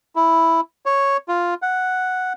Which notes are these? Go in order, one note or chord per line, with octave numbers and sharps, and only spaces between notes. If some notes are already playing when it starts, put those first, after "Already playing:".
E4
C#5
F4
F#5